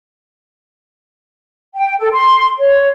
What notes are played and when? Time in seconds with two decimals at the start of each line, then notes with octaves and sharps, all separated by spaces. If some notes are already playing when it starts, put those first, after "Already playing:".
1.75 G5
1.99 A4
2.12 C6
2.59 C#5